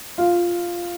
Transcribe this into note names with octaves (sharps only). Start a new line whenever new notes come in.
F4